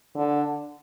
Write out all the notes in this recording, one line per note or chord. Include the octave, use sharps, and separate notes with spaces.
D3